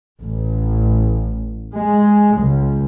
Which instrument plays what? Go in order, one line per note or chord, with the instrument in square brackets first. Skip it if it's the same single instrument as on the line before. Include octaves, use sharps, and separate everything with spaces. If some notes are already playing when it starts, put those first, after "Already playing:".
[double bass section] A1
G#3
C#2